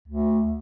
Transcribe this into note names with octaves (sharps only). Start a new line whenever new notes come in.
D2